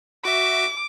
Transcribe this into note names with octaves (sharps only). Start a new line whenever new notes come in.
F#4 E5 D6